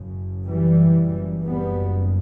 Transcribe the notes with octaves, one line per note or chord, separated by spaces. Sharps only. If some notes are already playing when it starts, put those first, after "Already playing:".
Already playing: F#1 F#2 C#3
E3 G3
F#1 F#2 C#3
G3 B3